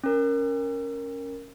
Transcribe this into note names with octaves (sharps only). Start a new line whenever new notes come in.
C#4 A#4